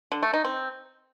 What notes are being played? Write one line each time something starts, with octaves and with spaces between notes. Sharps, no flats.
D3
A3
D#4
C4